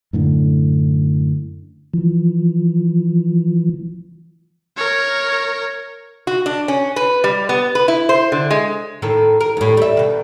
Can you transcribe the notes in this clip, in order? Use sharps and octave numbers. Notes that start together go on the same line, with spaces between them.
F#2 A2 D3
E3 F3
A#4 C#5
F#4
D4
C#4
B4
G3
B3
B4
E4
C5
D3
G#3
A2 D#3 A4
A#4
D#2 A2
G3 E5
B2 D#3